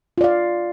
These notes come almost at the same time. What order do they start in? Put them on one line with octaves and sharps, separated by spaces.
F4 D5 F5